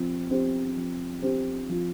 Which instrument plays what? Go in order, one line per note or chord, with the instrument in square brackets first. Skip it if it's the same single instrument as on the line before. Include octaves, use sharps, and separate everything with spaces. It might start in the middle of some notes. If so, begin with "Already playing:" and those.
Already playing: [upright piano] F3 C4
C4 G4 C5
F3
C4 G4 C5
F3